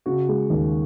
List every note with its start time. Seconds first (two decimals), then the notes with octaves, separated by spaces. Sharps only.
0.06 C#3 F#4
0.28 G#3
0.50 D#2